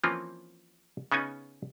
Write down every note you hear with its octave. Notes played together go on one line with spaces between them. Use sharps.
E3 F3 A#3 C4 C#4 F4
C#3 B3 C#4 D#4 G#5